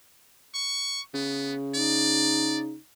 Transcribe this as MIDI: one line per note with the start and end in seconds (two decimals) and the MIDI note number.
0.54 1.01 85
1.14 2.75 49
1.14 1.54 59
1.75 2.76 63
1.75 2.59 74